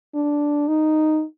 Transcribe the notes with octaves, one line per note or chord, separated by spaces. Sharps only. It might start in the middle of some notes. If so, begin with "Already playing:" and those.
D4
D#4